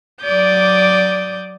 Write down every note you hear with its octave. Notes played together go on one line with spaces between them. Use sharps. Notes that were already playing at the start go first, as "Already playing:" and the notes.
F#3 D5 D6 D#6 G6